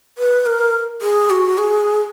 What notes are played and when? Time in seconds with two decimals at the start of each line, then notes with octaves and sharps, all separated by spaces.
0.18 B4
0.46 A#4
1.02 G#4
1.30 F#4
1.58 G#4